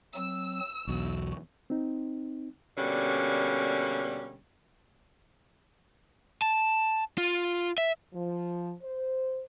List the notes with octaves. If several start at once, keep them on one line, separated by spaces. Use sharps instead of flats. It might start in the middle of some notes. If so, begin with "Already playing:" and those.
F#3 C4 E6
B1 E2 F#4
C4 D#4
B2 D3 G3 A#3 C#4
A5
F4
E5
F3
C5